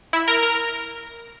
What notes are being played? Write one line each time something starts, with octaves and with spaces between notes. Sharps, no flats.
E4
A#4
A#4